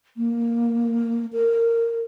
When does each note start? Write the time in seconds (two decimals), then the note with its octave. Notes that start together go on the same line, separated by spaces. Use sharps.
0.17 A#3
1.33 A#4